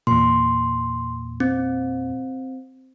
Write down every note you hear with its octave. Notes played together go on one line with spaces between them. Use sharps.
E2 A#2 C6
C4